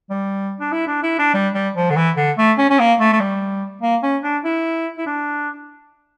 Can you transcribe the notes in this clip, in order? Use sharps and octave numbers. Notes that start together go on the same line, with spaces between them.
G3
D4
E4
D4
E4
D4
G3
G3
F3
D3
E3
D3
A3
C#4
C#4
A#3
A3
A3
G3
A#3
C#4
D4
E4
E4
D4